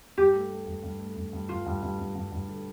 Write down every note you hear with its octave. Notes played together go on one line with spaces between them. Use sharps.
G2 G4
A3
A3
G2
G2
A3
G2
G2
G2 F4
G2
G2
G2
G2
G2
D3